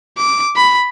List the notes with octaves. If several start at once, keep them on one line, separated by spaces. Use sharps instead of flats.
D6
B5